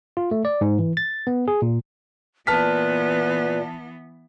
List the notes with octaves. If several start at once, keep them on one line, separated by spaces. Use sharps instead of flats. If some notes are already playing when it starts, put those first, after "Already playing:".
F4
A3
D5
G#2
E3
A6
B3
G#4
A#2
A#2 E3 B3 B4 A5 F6 B6